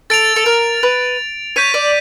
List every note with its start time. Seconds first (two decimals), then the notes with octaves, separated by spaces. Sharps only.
0.10 A4 A6 D7 F7
0.36 A4
0.46 A#4
0.83 B4
1.56 C#5 G6 B6 D#7
1.74 D5